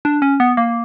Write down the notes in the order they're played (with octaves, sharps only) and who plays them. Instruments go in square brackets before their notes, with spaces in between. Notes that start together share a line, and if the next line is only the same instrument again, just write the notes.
[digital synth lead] D4
C#4
B3
A#3